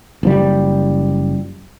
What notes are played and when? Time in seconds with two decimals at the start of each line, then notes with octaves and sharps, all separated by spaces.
0.23 F#1 F3 G3